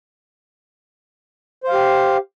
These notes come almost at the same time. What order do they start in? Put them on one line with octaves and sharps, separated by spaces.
C5 F5 G4